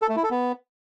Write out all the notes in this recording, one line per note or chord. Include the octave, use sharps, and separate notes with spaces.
A4
A3
E4
A4
B3